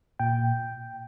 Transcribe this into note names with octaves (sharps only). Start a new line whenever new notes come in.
A#2 G5